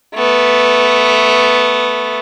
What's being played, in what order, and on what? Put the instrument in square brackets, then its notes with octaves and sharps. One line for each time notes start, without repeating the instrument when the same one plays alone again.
[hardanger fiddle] A3 B3